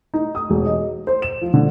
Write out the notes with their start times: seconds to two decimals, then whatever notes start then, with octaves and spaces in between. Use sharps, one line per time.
0.14 D#4
0.35 D#6
0.50 E1
0.66 D#5
1.07 C5
1.22 E7
1.41 F3
1.54 D3